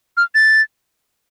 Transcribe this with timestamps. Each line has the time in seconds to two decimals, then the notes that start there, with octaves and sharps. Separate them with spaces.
0.17 F6
0.35 A6